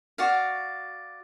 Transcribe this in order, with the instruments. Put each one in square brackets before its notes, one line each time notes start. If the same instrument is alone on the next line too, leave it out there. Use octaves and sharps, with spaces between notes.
[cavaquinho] F#4 D5 F5